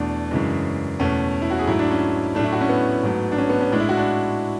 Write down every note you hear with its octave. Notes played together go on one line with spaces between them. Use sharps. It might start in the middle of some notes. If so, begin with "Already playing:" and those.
Already playing: E2 B2 A3 D4
F#2 C#3 E3 G#3
E2 B2 A3 C#4
E4
F#4
G#4
G#2 F#3 A3 E4
D4
C#4
A2 F#3 A3 D4
E4
F#4
C#4
B3
G#2 F#3 A3
D4
C#4
B3
C#4
A2 G#3 D4
E4
F#4
D4